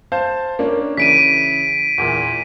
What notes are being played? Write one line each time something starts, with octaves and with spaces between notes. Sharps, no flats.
C5 F5 A5
A#3 C#4 D4
C#3 E3 B6 D7 D#7
E2 A#2 E3